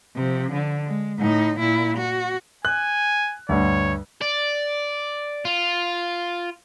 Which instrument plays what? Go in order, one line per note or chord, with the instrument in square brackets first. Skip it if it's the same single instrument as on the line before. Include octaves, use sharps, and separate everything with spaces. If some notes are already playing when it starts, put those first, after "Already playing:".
[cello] C3 F3
D3
G#3
A2 D#4
A#2 E4
F#4
[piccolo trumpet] G#5 [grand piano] F#6
[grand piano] D2 G2 [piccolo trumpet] C#5
[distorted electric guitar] D5
F4